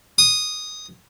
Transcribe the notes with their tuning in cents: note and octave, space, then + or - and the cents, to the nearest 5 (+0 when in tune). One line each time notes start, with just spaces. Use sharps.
D#6 -5